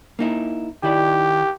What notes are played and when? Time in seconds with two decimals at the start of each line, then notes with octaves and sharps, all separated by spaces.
0.19 A#3 D#4 E4
0.83 D#3 E4 G4 D5